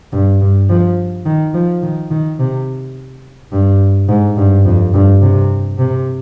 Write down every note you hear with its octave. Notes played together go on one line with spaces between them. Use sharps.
G2
G2
F3
D#3
F3
D#3
D#3
C3
G2
G#2
G2
F2
G2
C3
C3